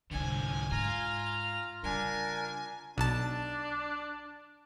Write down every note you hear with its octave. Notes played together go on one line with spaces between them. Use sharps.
C2 G#2 D3 F3 G#5
G#2 F4 A#5 F6
C#3 G3 D4 A#4 G#5
B1 D4 A5